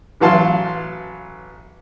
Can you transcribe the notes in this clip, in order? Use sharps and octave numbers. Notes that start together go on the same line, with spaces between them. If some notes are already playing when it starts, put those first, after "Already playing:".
A1 E3 F#3 F5 A5 C6